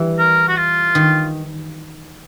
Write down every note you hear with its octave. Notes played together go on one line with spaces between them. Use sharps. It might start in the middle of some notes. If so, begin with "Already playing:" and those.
Already playing: E3 G3
A#4
F#4
F4
D#3